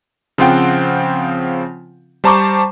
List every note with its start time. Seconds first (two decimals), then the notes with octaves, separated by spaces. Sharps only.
0.38 C#3 F3 C4 F4 F#5 G5
2.24 G3 C5 A5 A#5 C#6 D6